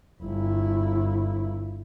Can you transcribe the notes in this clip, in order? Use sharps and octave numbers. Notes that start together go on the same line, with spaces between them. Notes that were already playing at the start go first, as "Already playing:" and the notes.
G1 E4